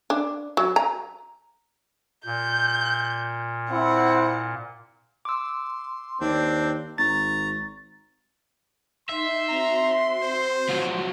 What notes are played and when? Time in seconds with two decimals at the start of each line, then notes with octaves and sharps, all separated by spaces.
0.10 D4
0.57 F#3
0.76 A#5
2.26 A#2 G6
3.71 C4 E4 F#5
5.25 C6 D6 E6
6.21 D#2 C4 D4 D5
6.98 G#1 A#5 C#6 A6
9.09 D#4 E5 C6
9.49 C4 F#4 A#5
10.23 C5
10.70 F3 F#3